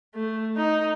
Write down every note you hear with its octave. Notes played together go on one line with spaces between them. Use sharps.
A3
D#4